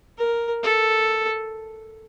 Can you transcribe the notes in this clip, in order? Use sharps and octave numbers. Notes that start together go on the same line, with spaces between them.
A#4
A4